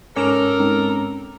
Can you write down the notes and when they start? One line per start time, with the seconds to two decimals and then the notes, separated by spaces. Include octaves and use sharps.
0.16 G#2 C#4 A4 A#4 D6 C#7 E7 F7
0.59 G#3 C4 D#4
0.90 A#5